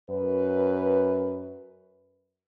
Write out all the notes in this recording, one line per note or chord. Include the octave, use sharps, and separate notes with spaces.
F#2 B4